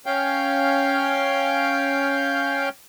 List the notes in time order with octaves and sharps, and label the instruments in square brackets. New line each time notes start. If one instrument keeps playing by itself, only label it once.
[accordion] C#4 F5 G5